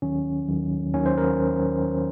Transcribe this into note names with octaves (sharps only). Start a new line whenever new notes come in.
D#2 D#3 F#3 C#4
D#2 D#3 F#3
D#2 D#3 F#3 C#4
C5
A#4